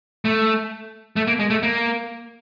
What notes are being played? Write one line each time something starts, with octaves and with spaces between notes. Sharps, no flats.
A3
A3
A#3
G#3
A3
A#3